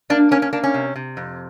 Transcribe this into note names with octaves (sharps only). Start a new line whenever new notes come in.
A#3 D4
A#3 C#4
C#4
A#3 D4
C#4
C3
C3
F2